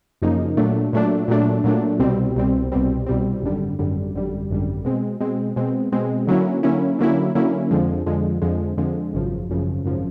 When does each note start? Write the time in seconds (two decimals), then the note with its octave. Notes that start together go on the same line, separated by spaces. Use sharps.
0.22 F#2 C#3 F3 A#3 D#4
0.57 A#2 F#3 A3 D4
0.93 A#2 F#3 A3 D4
1.28 A#2 F#3 A3 D4
1.64 A#2 F#3 A3 D4
1.99 C2 B2 G3 C4
2.36 C2 B2 G3 C4
2.72 C2 B2 G3 C4
3.06 C2 B2 G3 C4
3.42 G#1 F#2 D3 G3
3.79 G#1 F#2 D3 G3
4.14 G#1 F#2 D3 G3
4.49 G#1 F#2 D3 G3
4.85 B2 G#3 C4
5.21 B2 G#3 C4
5.56 B2 G#3 C4
5.92 B2 G#3 C4
6.27 D3 F#3 A#3 C#4 E4
6.63 D3 F#3 A#3 C#4 E4
6.99 D3 F#3 A#3 C#4 E4
7.35 D3 F#3 A#3 C#4 E4
7.71 F2 D3 F3 G#3
8.06 F2 D3 F3 G#3
8.42 F2 D3 F3 G#3
8.78 F2 D3 F3 G#3
9.14 G#1 F#2 C#3 F3
9.49 G#1 F#2 C#3 F3
9.84 G#1 F#2 C#3 F3